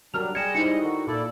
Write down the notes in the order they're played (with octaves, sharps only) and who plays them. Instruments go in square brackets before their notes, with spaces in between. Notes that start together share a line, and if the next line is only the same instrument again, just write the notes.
[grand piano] F#3 A#4 [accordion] G3 D4 [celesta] F6 F7
[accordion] G3 G#3 D#5 [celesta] G#6 E7 [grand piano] C#7
[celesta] D#4 C#7 [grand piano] E4 C5
[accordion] D3 D#3 F#4
[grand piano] A#2 [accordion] E4 A4 D5